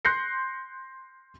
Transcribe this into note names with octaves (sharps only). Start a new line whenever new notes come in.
C6 F#6 G6 A#6 C7 C#7